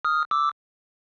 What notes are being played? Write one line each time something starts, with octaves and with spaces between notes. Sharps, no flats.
D#6 F6
D6 E6